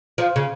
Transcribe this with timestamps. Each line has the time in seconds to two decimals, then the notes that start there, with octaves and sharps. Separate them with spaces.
0.18 F3
0.36 C#3